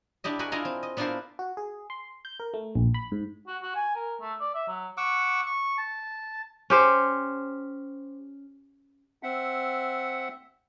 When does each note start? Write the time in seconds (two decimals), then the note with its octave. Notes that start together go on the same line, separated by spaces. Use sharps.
0.24 D4 E4 G4 D#5
0.39 F#4 G#4 A#4 B4 F#5 G#5
0.52 D4 E4 F4 G#4 D#5 A#5
0.65 C4
0.83 D#5
0.97 B3 D4 E4 F4 A#4 C5
1.39 F#4
1.57 G#4
1.90 C6
2.25 G6
2.40 A#4
2.54 A3
2.75 A#1
2.94 B5
3.12 G#2
3.48 F#4
3.62 F#4
3.75 G#5
3.95 A#4
4.21 A3
4.40 D5
4.55 E5
4.68 F#3
4.97 F#5 C#6 D6 E6
5.46 C#6
5.78 A5
6.70 C#4 G4 C5
9.23 C4 E5 F#5